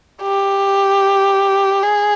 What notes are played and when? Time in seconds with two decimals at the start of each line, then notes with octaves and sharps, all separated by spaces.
0.22 G4
1.83 G#4